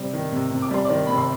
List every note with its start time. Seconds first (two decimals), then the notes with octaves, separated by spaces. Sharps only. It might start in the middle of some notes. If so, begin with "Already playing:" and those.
Already playing: C3 G3 C5
0.13 D#3
0.32 C3
0.51 C3
0.62 D6
0.71 G3 C6
0.85 D#3 D5 D6
1.07 C3 B5
1.18 C6